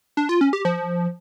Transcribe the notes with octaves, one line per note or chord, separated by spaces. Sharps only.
D4
F4
C#4
G4
F3